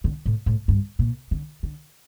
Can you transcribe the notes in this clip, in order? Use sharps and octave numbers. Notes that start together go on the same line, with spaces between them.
D3
A2
A2
G2
A#2
D3
D3